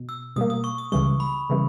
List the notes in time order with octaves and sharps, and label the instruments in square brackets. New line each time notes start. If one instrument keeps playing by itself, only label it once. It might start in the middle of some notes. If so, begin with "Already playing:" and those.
Already playing: [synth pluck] B2
[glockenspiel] E6
[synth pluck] B2 G3 A#3 [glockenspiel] D#6
[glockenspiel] D#6
C#6
D#6
[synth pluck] C#2 C#3 E3 G3 [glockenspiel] C#6
[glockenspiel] B5
[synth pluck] C#3 E3 G3